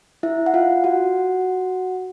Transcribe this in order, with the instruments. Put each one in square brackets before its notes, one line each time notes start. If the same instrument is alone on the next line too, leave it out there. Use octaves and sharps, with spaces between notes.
[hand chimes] E4 E5
F#5
F4 F5
F#4 F#5